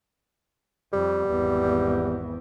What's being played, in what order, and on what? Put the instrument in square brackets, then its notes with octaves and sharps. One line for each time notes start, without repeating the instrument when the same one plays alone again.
[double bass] F2 [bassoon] G3
[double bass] G#1 E2